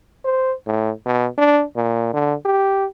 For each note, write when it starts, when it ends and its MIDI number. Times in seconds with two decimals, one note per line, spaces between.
0.25 0.53 72
0.67 0.91 45
1.06 1.28 47
1.38 1.63 62
1.76 2.10 46
2.14 2.34 50
2.45 2.86 67